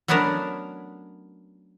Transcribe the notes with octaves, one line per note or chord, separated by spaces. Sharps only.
F#3 A3 B3 C#4 D4 A#4